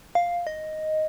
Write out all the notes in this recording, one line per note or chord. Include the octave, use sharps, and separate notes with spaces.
F5
D#5